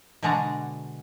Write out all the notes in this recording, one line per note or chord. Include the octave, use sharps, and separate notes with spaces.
B2 D3 G#3 D4 F#4 A#5